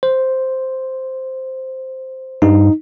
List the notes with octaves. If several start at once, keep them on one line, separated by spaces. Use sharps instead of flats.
C5
G2 D#4